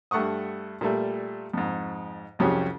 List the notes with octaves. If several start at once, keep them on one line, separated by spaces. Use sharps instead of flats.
G2 A3 F#5 C#6 D#6
A#2 G3 A3
F2 G#2
C2 F2 F#3 C#4 G4 G#4